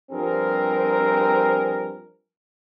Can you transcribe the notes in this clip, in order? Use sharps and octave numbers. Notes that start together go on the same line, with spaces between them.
G2 F3 G3 C4 G#4 A#4